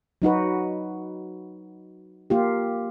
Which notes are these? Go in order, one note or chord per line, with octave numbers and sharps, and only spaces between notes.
F#3 D#4 F#4 B4
A#3 F4 G4